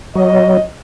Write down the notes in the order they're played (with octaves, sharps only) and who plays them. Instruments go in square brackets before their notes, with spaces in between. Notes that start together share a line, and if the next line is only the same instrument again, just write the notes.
[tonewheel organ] F#3 [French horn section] D#5